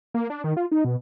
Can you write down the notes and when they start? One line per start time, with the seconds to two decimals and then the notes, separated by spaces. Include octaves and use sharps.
0.14 A#3
0.30 D4
0.44 D#3
0.57 F4
0.72 D#4
0.85 B2